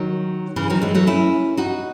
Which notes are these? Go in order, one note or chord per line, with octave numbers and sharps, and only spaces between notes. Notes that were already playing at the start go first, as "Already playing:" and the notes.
Already playing: D#3 F#3
C#3 E3
D#3 F#3
E3 G#3
F#3 A3
C#4 E4
D#4 F#4